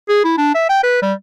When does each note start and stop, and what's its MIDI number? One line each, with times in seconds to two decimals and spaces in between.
0.09 0.23 68
0.25 0.37 64
0.38 0.54 62
0.55 0.66 76
0.69 0.81 79
0.83 1.00 71
1.02 1.13 55